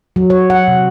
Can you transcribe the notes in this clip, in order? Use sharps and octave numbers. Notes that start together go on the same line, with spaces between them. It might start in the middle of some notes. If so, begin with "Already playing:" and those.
F#3
C#5
F#5
C3